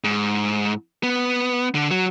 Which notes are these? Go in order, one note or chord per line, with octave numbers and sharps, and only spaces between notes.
G#2
B3
D3
F#3